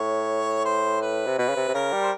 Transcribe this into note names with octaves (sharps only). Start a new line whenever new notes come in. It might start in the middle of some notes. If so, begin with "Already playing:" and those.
Already playing: A2 C#5
C5
B4
C3
B2 B4
C#3
C3
C3
C#3 A#4
G3
C5